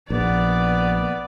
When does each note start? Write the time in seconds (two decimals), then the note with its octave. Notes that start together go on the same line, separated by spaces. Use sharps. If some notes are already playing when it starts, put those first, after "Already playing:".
0.10 A#1 B3 D5